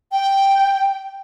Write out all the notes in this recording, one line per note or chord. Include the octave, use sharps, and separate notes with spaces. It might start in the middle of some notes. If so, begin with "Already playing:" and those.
G5